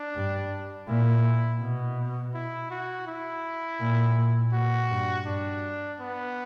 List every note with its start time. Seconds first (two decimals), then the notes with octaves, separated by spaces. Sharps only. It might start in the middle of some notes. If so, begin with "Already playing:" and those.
Already playing: D4
0.15 G2
0.88 A#2 E4
1.60 B2
2.34 E4
2.70 F#4
3.07 E4
3.80 A#2
4.17 A#2
4.53 A#2 F#4
4.90 G2
5.26 G2 D4
6.00 B3